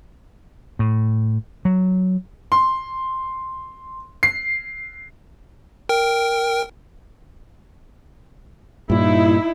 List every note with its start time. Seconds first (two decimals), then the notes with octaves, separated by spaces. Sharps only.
0.79 A2
1.65 F#3
2.52 C6
4.23 C7
5.89 A#4 G5
8.90 G2 A#2 D#4 E4